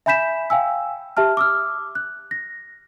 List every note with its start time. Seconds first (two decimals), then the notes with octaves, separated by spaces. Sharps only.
0.06 E5 G#5 B5 G6 B6 E7
0.50 F5 G5 G#5 E6
1.17 G4 E5 A5 F6
1.37 D6 E6 F6
1.95 F#6
2.31 A#6